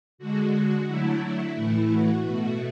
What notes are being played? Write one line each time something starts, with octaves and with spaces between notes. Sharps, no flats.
D3 G#3 F#4
D3 F#3 A3 E4
A2 E3 A3
F#4
B2 A3